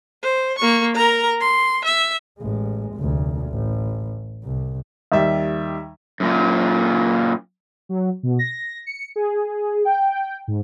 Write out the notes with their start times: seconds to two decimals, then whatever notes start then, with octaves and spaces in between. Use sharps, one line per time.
0.23 C5
0.58 A#3 C#6
0.95 A#4 A#5
1.41 C6
1.85 E5
2.39 A1 G#3
2.96 F1 D2
3.49 A1
4.44 C2
5.12 D#2 G3 E5
6.20 F#2 A#2
7.89 F#3
8.23 B2
8.39 A#6
8.86 C#7
9.16 G#4
9.85 G5
10.48 G#2